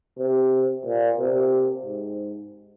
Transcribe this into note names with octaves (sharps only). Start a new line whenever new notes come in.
C3
A#2
C3
G#2